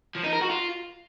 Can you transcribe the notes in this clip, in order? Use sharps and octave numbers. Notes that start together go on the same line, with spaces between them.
F3
D#4
A#4
F#4
F4